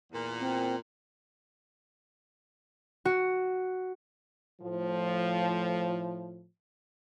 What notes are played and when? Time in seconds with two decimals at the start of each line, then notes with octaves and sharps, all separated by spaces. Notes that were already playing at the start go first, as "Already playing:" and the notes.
0.12 E2 A#2
0.39 C4
3.05 F#4
4.62 A2 F3